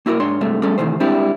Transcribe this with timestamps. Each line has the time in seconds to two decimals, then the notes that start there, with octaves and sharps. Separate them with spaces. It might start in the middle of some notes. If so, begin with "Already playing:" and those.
0.06 A#3 E4 F#4 A4 A#4
0.20 G#2 D4 C#5 C6
0.41 G2 C3 G#3 A3
0.63 G3 A3 C#4 G#4 A4
0.78 C3 D#3 E3 A3 C5
1.00 G3 G#3 C4 D4 E4 G4